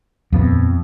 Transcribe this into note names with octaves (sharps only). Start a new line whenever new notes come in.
D#1 F2 F3 B3